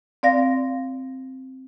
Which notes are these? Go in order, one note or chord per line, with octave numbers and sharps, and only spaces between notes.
C4 D5 F5 A#6